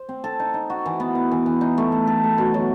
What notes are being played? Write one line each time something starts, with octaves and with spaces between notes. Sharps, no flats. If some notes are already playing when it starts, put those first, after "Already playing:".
Already playing: C5
C4
A4
D#4
D#4
F#4
E3
B3
B3
E3
E3
D#4
A3
A4
A4
A3
B2
F#3